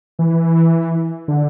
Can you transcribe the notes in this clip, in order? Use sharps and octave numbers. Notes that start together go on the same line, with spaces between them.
E3
D3